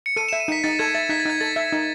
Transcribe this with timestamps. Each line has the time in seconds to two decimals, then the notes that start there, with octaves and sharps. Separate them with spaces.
0.06 C#7
0.16 A4 D#7
0.29 E7
0.33 E5
0.40 D#7
0.48 D#4 B6
0.64 D#4 A6
0.79 A4 G#6
0.95 E5 A6
1.09 D#4 B6
1.20 A6
1.26 D#4 G#6
1.41 A4 A6
1.56 E5
1.72 D#4